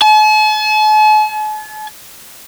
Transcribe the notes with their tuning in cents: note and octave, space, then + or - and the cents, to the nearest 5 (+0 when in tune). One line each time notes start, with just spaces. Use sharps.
A5 -45